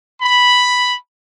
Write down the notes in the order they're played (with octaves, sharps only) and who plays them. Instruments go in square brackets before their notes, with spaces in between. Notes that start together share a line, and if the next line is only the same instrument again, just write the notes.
[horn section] B5